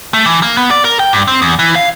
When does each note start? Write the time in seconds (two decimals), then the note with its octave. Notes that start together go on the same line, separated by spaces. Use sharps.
0.14 A3
0.26 E3
0.43 A#3
0.57 B3
0.71 D5
0.85 A#4
0.99 G5
1.13 G2
1.28 C4
1.42 E2
1.59 E3
1.76 F5